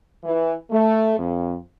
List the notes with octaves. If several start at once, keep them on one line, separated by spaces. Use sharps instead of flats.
E3
A3
F2